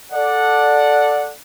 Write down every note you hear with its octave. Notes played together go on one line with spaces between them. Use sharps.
A4 D5 F#5